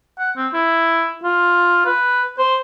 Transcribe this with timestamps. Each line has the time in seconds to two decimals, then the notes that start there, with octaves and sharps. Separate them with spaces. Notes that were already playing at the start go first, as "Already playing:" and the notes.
0.19 F#5
0.37 C4
0.54 E4
1.24 F4
1.86 B4
2.39 C5